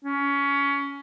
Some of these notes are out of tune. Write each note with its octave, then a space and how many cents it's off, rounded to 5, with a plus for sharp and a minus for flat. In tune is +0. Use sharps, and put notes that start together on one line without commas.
C#4 +20